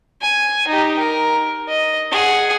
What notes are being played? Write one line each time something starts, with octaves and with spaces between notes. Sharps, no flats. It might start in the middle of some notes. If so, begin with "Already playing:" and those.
G#5
D#4 G4
A#4
D#5
G#4 F#5